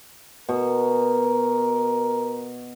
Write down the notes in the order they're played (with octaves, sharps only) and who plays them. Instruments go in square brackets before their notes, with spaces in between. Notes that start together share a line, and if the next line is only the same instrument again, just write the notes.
[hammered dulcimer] B2 [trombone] A#4